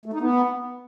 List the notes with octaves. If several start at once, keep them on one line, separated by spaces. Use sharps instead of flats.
A3
D#4
B3